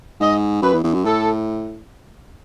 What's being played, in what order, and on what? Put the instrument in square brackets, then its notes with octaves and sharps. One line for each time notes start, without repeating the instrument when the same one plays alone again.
[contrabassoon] G#2 [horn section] D#5
[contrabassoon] F#2 [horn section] B4
[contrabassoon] E2
E2
F#2
[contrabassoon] A2 [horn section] A4